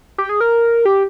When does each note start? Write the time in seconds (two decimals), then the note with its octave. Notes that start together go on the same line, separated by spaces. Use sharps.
0.18 G4
0.29 G#4
0.41 A#4
0.85 G4